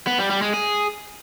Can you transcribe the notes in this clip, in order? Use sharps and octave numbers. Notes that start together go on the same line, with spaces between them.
B3
G3
G3
G#3
G#4